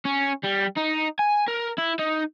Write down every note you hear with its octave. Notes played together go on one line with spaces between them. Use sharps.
C#4
G3
D#4
G#5
A#4
E4
D#4